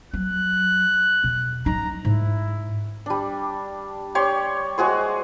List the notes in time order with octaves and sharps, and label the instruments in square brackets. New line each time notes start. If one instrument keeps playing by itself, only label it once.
[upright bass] F#3 [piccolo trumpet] F#6
[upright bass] E2 B2
[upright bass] F#3 D#4 [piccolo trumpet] A#5
[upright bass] G#2 [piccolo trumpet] E4
[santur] G3 D4
G4 C#5 D5 C6
G#3 F#4 G#4 C5